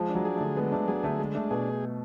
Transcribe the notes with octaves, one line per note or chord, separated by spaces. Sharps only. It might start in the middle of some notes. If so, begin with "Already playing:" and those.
Already playing: F3 G#3
D4
F#3
G#4
D3 A3
G#3 B3
A3 D4
F#3 G#4
D3 A3
G#3
A3 D4
B2 G#4